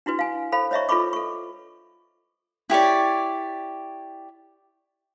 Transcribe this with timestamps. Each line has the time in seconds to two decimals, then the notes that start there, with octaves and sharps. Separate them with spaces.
0.06 D4 E4 F#4 B4
0.19 F5 G#5
0.52 A4 C5 F5 B5
0.71 C5 C#5 D#5 E5 A#5 C#6
0.89 F4 A4 B4 B5 C#6 D6
1.13 A4 C#6
2.70 E4 G4 C#5 D5